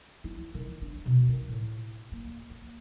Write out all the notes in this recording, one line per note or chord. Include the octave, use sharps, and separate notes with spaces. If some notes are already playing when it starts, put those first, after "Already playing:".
E4
D#3
D4
B2
D#3
A2
A#3
A#3